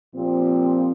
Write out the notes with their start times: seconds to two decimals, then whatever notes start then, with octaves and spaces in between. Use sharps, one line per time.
0.13 A#2 F3 C4 G4